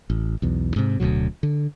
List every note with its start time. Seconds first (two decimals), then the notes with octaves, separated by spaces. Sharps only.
0.10 A1
0.42 B1 E2
0.76 G#2 C3
1.00 D1 D2 B2 F#3
1.43 D3